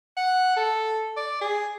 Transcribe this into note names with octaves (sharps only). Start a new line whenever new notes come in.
F#5
A4
D5
G#4